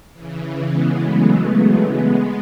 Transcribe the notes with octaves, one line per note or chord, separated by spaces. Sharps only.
C#3 E3
G#3 B3
F#3 A3
F#3 A3
G#3 B3